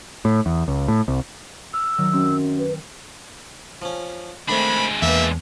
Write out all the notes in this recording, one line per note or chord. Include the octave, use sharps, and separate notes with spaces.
A2
E2
C#2
A2
C2
E6 F6
D#3 F#3
F#2 C4
B4
F3 C#4
D#3 G#3 A3 C4 D4 B5
E2 A#3 B4 E5